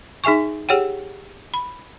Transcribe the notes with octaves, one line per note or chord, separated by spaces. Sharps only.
D#4 G#4 E5 G#5 C#6
G4 G#4 C#5 F#5 G5
B5